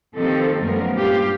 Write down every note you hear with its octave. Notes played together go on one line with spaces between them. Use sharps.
D#3 F3 C4 G4 A4
F#2 F3 G3 A3 B3 A#4
G2 A#2 F4 G4 F5